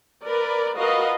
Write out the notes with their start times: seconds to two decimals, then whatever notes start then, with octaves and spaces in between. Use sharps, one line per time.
0.25 A#4 B4 D5
0.78 F4 F#4 A#4 B4 D#5 F5